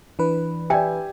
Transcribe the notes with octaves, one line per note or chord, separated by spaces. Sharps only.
E3 D4 B4
G4 D5 E5 G5 G#5